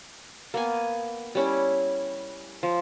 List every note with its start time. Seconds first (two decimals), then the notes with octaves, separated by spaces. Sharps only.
0.54 A#3 B3 G#5
1.35 G3 C#4 E4
2.63 F3